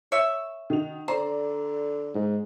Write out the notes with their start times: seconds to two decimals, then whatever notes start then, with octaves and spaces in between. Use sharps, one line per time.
0.12 C#5 E5
0.70 D#3 F#4 F7
1.08 D3 C5 D5 A#5
2.14 G#2